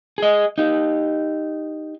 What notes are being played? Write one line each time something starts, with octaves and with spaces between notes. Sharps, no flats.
G#4 D#5
D#4 G4